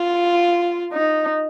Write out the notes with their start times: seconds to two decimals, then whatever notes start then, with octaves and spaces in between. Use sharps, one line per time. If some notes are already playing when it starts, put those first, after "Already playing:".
Already playing: F4
0.93 D#4